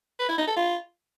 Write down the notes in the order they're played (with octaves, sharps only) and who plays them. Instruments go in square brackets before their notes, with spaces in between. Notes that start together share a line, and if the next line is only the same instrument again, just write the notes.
[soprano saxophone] B4
E4
D#4
A4
F4